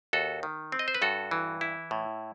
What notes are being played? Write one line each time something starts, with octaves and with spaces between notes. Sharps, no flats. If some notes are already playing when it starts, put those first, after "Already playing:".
D#2 F#4 A4
D#3
C4
D#5
C5
B4
G2 F#4 A4
E3
E4
A2